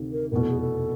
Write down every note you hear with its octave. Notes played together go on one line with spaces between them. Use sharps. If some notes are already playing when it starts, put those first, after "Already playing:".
Already playing: D2 C3 D#3
A#4
F1 E2 B2 A#4
A4
G#4
A4